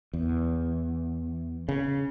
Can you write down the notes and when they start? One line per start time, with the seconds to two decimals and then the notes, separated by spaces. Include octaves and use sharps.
0.13 E2
1.69 C#3